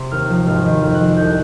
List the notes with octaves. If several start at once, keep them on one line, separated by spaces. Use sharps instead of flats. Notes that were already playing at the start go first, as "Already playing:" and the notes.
Already playing: C3 C6
D#2 F6
F3
G#1 F6
D#3
F2 F6
F#6
F3
C2 G6
F#6